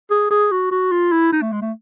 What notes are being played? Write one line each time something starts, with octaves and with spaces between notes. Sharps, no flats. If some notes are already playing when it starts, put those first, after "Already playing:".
G#4
G#4
F#4
F#4
F4
E4
D#4
A3
G#3
A3